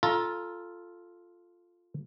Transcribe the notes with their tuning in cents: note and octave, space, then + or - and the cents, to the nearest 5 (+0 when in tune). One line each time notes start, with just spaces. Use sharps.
F4 +0 A4 +0 A#5 +20